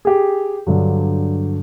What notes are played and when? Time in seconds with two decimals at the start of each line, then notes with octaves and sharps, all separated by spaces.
0.05 G4 G#4
0.67 G2 D3 F#3